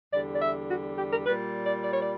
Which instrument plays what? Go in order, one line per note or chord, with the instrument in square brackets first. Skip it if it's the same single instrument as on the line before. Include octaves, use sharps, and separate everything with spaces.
[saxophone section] E2 D3 G3 D5
D5
E5
F#4
G4
A#4
A#2 G3 B4
D5
D5
C#5
D5